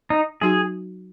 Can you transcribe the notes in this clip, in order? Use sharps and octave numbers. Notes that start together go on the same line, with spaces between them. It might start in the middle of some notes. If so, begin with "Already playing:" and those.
D#4
F#3 D#4 F#4 G#4